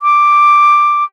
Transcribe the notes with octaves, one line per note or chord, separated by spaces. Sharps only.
D6